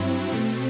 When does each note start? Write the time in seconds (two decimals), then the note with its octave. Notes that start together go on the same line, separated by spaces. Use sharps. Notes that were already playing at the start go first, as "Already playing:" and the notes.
Already playing: G2 F#3 C4 E4
0.32 B2 A3 C4